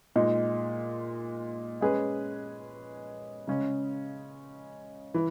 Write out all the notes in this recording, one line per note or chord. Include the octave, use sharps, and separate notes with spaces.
A#2 G#3 D#4
G#3 C#4 G#4 B4
C#3 G#3 C#4
E3